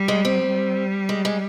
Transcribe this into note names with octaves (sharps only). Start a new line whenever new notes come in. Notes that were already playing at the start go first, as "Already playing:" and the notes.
Already playing: G3
G#3
C4
G3
G#3
G#3